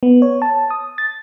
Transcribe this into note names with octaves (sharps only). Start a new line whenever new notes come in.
B3
C#5
A5
D#6
A6